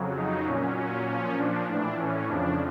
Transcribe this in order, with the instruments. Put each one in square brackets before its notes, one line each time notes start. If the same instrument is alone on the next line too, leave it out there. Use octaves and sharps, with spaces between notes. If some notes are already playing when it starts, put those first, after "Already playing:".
Already playing: [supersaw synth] F2 C#3 F#3
D#4
A#2 F#3 C#4
C#4
A#2 F3 C#4
D4
A2 E3 D4
C#4
F2 C#3 F3 D4